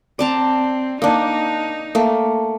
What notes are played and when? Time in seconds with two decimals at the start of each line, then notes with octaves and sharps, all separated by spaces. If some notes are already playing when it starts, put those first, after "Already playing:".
0.19 C4 D5 A5 A#5
1.02 A#3 D4 D#4
1.95 A3 A#3